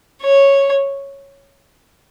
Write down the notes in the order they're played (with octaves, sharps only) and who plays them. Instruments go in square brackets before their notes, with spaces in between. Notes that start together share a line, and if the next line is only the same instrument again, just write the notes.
[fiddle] C#5